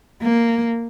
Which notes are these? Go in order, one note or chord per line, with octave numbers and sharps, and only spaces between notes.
A#3